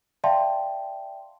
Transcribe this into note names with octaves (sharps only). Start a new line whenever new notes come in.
D5 E5 F5 G5 A5 C6